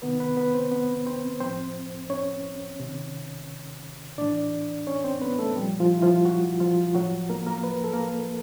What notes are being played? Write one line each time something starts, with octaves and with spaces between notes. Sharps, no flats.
C3 D#3 B3 B4
B3 B4
B3 B4
C4 C5
B3 B4
C4 C5
A2 F3 C4 C5
C#4 C#5
C3 D#3
A2 E3 D4 D5
C#4 C#5
C4 C5
B3 B4
A3 A4
A#2 F3 G3 G4
F3 F4
E4
F3 F4
F#3 F#4
F3 F4
A2 F3 F#3 F#4
A#3 A#4
A#3 A#4
B4
A#4
A4
A#3 A#4